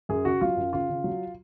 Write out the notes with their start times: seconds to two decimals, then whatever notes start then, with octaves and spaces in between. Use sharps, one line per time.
0.09 F#2 G#4
0.25 C#3 F#4
0.41 F#3 F4
0.56 F#2
0.73 C#3 F4
0.89 C#3
1.04 F#3